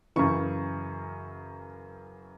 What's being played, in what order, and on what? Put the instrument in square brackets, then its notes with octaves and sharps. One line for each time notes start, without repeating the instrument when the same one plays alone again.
[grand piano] F#2 C#3 E3 C#6